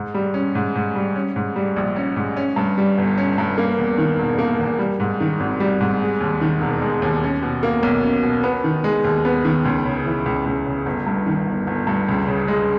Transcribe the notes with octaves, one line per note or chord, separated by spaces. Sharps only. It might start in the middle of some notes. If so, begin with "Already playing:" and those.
Already playing: G#2
G3
C#4
G#2
G#2
G3
C#4
G#2
G3
A#1
C#4
G#2
C#4
G2
G3
G1
C#4
G2
A#3
E2
D#3
E1
A#3
E2
G3
G#2
D#3
G#1
G3
G#2
G#3
D#2
D#3
E1
G#3
D#2
C#4
B2
A#3
B1
C#4
B2
B3
D#3
G#3
D#2
B3
D#3
C#2
C#3
E3
C#2
C#2
C#3
G1
G2
D#3
G1
G1
G2
C#2
C#3
G#3